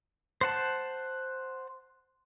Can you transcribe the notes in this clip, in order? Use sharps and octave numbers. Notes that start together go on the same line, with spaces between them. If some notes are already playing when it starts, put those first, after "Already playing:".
C5 F#5 A5